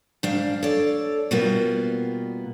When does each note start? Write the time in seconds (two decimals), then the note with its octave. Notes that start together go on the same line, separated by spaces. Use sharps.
0.23 G#2 D4 F5
0.63 A4 C#5 D5
1.31 B2 G3 A#3 B3 F4